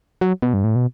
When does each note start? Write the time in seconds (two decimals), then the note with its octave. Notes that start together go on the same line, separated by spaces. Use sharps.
0.21 F#3
0.42 B2
0.54 G2
0.64 A2
0.75 B2